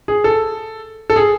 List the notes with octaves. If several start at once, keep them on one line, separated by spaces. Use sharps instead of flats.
G#4
A4
A4
G#4